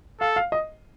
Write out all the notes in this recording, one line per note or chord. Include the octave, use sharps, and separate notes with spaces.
A4 F5
F5
D#5